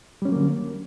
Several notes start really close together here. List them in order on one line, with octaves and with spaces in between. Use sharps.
G3 C#4 F#3 A#3 D3